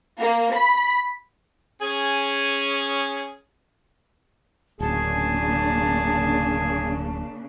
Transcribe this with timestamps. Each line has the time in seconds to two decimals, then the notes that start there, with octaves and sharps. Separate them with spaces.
0.19 A#3
0.53 B5
1.82 C#4 G#4 G#5
4.80 D1 C#3 A#3 D4 G#4 A5